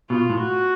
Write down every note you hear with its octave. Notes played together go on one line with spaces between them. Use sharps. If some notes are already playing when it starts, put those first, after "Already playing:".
B2 F4
A2
F#4